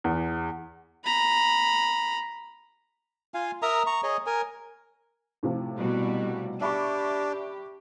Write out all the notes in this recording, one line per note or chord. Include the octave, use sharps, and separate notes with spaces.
E2
A#5 B5
F4 F5 G#5
A#4 E5 A#5 D#6
A#5 C#6
G#4 C#5 D#5
A#4 G#5
A2 C3 F3
B2 G3 F#4
D4 G4 E5 B5 C#6